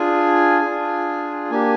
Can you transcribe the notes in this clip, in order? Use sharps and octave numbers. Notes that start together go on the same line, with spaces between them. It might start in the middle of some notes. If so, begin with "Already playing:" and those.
Already playing: D4 F4 G#4 G#5
D4 F4 G#4
A#3 D4 G4 G#5